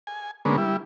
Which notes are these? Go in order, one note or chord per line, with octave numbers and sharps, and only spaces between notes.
G#5
D3 G#3 A#3 B3 C#4
G3 E4